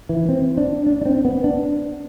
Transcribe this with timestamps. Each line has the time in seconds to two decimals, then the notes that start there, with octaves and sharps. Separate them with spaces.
0.09 E3
0.29 C4
0.57 D4
0.86 D4
1.01 D4
1.06 C4
1.25 B3
1.44 D4